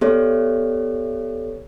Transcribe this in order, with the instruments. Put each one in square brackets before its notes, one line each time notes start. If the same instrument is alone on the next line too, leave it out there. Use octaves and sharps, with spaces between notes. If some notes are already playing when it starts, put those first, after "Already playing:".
[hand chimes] B3 G4 A4 C#5 D5